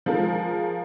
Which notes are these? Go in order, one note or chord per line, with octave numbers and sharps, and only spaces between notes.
F3 G#3 F4 A#4